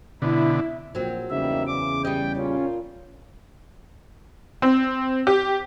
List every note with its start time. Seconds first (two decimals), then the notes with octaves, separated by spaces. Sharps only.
0.22 B2 D3 E4
0.95 A#1 F#3 C4
1.30 E2 C#3 G3 A#3 D#4 E5
1.67 E3 D6
2.05 G3 D#5 G5
2.37 A#2 C#4 F4
4.62 C4
5.27 G4